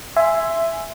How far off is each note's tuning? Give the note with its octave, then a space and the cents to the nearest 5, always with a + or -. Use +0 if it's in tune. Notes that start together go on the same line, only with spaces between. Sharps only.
E5 +10 G#5 +0 C6 +0